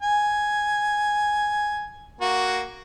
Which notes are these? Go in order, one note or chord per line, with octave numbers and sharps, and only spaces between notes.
G#5
A#3 F#4